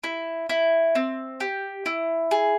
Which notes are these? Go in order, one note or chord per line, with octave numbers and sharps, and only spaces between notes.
E4
E4
C4
G4
E4
G#4